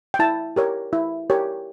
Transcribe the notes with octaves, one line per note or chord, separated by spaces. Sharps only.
G5
E4 A5
G4 A#4 C#5
E4
G4 A#4 C#5